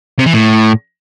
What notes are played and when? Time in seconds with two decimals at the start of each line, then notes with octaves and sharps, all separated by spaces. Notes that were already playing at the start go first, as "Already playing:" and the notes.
0.19 C3
0.26 E3
0.33 A2